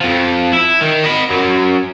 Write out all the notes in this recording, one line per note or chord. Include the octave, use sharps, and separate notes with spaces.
F2 F3
E4
D#3
D#5 B5
F#2 F#3